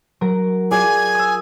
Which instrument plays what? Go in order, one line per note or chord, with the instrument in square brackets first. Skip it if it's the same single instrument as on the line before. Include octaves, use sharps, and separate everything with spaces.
[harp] F#3 A#4 A#6
[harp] F4 G#4 D5 [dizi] G#5
[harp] D#6 E6